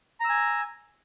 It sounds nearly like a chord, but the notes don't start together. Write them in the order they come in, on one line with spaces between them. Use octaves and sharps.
A#5 E6 G#5